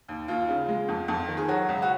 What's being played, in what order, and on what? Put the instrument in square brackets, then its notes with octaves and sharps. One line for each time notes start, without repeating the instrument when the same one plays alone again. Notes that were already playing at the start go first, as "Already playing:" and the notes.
[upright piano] D#2
D#2 F4
C#3
G#3
F2
F2
D#3
G#4
F#3 F#4
C#2
F#4